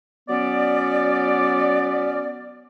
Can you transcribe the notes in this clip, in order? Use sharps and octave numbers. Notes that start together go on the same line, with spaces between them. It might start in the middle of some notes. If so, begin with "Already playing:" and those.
F#3 B3 C#4 D5